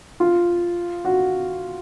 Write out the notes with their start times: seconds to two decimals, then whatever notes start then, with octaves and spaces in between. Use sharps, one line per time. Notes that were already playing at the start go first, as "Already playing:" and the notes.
0.20 F4
1.05 F#4